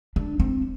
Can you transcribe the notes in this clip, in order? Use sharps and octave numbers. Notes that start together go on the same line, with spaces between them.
D4
C4